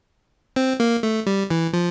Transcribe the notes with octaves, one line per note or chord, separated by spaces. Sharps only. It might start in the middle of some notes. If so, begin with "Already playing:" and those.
C4
A#3
A3
G3
E3
F3